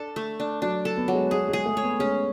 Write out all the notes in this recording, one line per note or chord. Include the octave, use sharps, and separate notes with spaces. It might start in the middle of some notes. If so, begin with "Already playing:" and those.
Already playing: D4 A4
A3
D4
F#3 D4
A4
B3
F#3
G#3
G#3 G#4
G#3
G#4
A3
C#5
B3
G#3 C#4